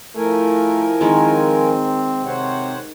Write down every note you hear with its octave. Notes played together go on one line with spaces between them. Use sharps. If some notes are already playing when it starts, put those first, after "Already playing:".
F3 A3 E4 A#4 G#5
D#3 G#3 C4
C3 C5 C#5 F#5